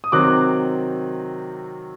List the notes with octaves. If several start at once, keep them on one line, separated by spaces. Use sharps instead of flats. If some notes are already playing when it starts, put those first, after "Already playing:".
D#6
C3 D#3 F#3 C4 D6 F#6